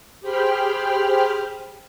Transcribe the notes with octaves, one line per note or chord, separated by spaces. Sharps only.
G4 G#4 C5 G5 B5 F6